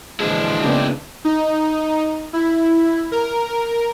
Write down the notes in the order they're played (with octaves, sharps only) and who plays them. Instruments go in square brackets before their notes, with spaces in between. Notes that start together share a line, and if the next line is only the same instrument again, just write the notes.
[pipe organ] A#2 D3 E3 [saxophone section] F3 G#3 [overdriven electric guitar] D4 E4
[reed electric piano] C#3 A#3 B3 [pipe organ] D5 G5
[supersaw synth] D#4
E4
A#4